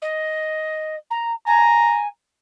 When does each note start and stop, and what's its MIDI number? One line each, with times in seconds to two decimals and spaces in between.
0.02 0.96 75
1.11 1.32 82
1.46 2.07 80
1.46 2.03 82